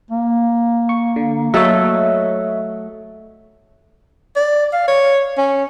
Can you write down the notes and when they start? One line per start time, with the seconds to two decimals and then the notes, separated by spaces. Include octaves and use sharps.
0.11 A#3
0.89 C#6
1.16 D3
1.54 F#3 A3 A4 C#5 D#5 E5
4.36 D5
4.73 F5
4.88 C#5
5.38 C#4